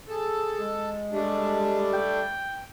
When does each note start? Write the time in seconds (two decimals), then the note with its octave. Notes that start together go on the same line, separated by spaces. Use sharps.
0.08 G#4 A4
0.60 G#3
1.12 G3 A3 D4 G4
1.93 G5